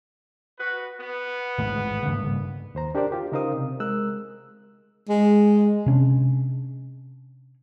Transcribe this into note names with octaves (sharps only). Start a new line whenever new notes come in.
F#4 B4
B3
A1 D2 G#2
G2 C#3 A#3
D#2 C5 A#5
D4 G4 A#4 C5 D5
F4 G4
C#3 D#4 A#4 C5 F5 D#6
C3
G#3 A#4 E6 F#6
G#3
C3 C#4 D4